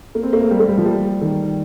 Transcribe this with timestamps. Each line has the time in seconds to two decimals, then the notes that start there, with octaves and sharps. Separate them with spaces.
0.15 A#3
0.23 C4
0.33 A#3
0.41 A3
0.51 G3
0.60 A#3
0.69 G3
0.78 F3
0.85 G3
1.21 D#3